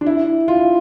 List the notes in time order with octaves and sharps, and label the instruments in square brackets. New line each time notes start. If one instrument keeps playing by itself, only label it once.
[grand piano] D4
E4
F4